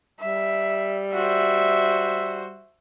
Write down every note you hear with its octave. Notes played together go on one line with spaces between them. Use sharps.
G3 E5
F#4 C5 E5